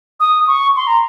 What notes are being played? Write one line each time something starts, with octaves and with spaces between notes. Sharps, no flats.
D#6
C#6
C6
A#5